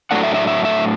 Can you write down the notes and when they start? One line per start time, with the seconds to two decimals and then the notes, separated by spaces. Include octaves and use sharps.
0.11 A2 F#3 A3 D4 F#5
0.23 E5
0.34 E5
0.47 E5
0.65 E5